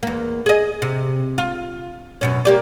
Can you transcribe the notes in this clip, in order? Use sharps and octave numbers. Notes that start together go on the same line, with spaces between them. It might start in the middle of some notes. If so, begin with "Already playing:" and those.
E2 A#3
G#4 D#5
C3
F4
F#2 B2 C#4
A#3 G4 D5